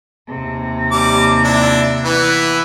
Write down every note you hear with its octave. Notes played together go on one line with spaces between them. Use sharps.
D#2 C3
G3 D6
D4 E4
E3 B3